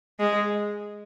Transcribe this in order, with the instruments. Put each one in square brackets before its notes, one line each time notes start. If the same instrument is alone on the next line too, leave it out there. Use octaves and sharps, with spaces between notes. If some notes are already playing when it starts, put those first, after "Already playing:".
[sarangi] G#3